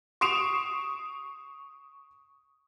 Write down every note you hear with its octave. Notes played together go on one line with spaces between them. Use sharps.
C#6 D#6 C7 D7 E7 F7